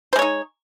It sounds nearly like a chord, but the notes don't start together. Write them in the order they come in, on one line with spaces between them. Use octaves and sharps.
C5 G#3 C#5 D#4